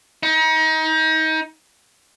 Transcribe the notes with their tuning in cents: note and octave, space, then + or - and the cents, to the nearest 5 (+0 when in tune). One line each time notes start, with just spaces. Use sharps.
D#4 +30